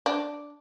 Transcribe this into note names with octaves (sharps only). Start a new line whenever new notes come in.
D4